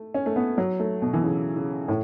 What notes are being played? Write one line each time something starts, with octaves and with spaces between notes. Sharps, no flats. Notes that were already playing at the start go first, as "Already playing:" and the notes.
Already playing: A3
C#4
A3
B3
F#3
A3
B2
E3
C#3
C#3
A2